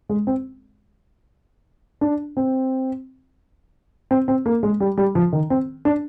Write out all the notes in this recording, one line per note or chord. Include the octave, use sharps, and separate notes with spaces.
G#3
C4
D4
C4
C4
C4
A#3
G#3
G3
G3
F3
D#3
C4
D4